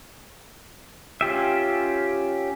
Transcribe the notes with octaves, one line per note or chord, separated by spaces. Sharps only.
C#4 F4 G4 E5